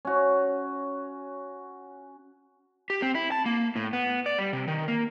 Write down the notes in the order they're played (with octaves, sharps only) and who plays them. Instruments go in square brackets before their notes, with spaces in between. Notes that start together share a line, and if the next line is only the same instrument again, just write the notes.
[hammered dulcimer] C#4 F#4
[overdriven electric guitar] G4
C4
E4
A5
A#3
A2
B3
D5
G3
C3
D#3
A#3